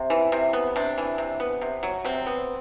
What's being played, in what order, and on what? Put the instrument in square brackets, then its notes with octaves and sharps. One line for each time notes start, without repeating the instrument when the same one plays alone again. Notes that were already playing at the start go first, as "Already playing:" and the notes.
Already playing: [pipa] C3
E3
C3
B3
C3 D4
E3
C3
B3
C3
F#3
C3 C4
B3